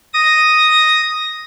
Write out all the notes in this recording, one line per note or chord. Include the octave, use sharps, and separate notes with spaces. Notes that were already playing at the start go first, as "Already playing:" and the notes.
D#6 A#6